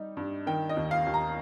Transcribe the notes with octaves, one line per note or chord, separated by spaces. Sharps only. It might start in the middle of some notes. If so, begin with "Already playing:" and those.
Already playing: G3 D#4
G2
D#3 G5
D#5
D#2
F5
D#2
A#5